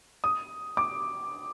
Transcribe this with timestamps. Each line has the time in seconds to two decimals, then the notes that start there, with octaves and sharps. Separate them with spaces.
0.24 D#6
0.77 D6